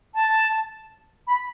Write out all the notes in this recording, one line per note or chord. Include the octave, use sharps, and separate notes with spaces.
A5
B5